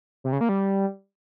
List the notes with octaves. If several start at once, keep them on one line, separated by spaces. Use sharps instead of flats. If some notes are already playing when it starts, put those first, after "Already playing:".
C3
C#3
A#3
G3